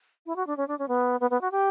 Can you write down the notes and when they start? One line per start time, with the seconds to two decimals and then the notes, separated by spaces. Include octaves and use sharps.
0.26 E4
0.36 F#4
0.47 D4
0.57 C#4
0.68 D4
0.79 C#4
0.88 B3
1.20 B3
1.30 B3
1.41 F#4
1.51 G4